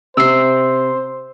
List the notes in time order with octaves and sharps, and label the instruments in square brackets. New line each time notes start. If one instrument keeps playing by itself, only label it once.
[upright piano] C3 [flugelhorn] C5 [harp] E6 C7